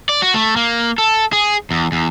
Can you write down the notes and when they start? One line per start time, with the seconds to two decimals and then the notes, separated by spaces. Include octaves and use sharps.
0.09 D5
0.22 F#4
0.34 A3
0.56 A#3
0.98 A4
1.33 G#4
1.71 E2
1.92 E2